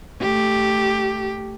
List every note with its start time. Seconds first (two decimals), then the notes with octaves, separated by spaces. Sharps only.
0.21 A3 G4